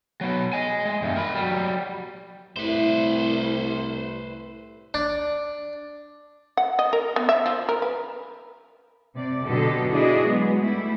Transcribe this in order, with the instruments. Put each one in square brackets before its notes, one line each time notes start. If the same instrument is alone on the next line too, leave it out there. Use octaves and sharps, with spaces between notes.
[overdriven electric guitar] F#3 B3
D#5 G#5
G#3
E2 G2
A#4 B5
F#3 G3
[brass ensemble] C2 [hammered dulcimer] A2 E4 [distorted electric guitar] B4 C5
[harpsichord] D4
[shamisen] F#5
D#5
A#4
B3
E5
F3
A#4
B4
[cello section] C3 D5
B2 D3 F#3 G4 A4 D#5
D4 E4 F#4 G#4 D#5
F#3 G#3 B3
G3 A3 E4